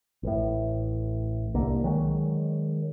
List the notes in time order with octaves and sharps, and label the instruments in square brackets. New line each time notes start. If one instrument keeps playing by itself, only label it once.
[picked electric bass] A1 A2
C2 D3 A#3
D#3 F#3 G#3